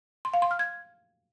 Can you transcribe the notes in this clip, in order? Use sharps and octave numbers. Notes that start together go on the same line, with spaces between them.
C6
F5
C6
F6
G#6